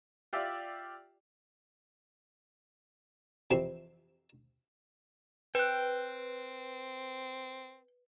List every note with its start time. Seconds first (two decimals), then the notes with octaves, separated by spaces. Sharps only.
0.33 F4 G4 D5 E5
3.51 F2 C3 E3 C4 E4
5.55 C4 B4 G5 F#6